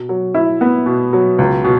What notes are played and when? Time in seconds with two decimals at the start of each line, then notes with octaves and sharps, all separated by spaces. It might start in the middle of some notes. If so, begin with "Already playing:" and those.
Already playing: B2
0.09 F#3
0.34 E4
0.61 B3
0.86 B2
1.13 F#3
1.39 C#2
1.64 B2